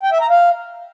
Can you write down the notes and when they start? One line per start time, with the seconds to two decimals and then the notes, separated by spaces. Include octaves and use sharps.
0.03 G5
0.12 E5
0.21 A#5
0.30 F5